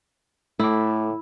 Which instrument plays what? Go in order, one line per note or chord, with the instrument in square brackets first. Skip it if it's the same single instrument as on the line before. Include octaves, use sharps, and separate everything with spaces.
[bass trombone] A2 [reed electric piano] A3 D6 [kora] E4